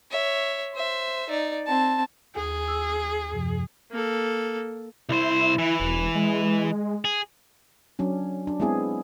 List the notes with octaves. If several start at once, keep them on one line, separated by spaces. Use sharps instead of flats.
C#5 E5
C5 E5
D#4 D5
C4 A5
D#2 G#4 G#5
E6
F#2 C3 F3
A#3 A4
C2 E4 C5
E3
E1
G#3
G#4
F#3 C#4 D4
D4
G#3 B3 C4 E4 G#4